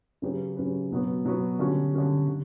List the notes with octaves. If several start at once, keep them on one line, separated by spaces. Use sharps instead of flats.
C#3 F#3 C#4 G4 B4
C#3 F#3 C#4 G4 B4
B2 F#3 B3 F#4 B4
B2 F#3 B3 F#4 B4
D3 G3 C#4 F#4
D3 G3 C#4 F#4
D3 G3